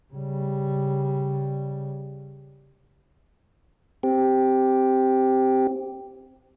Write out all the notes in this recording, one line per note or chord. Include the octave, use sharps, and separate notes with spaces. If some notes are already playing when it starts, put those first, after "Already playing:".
C#3 G3
C4 G4